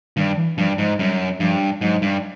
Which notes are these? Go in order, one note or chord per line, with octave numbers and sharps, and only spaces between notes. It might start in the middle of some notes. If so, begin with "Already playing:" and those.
G2 D#3
E3
G2 F3
G#2 F3
F#2 G3
G2 F3
G#2 F#3
G2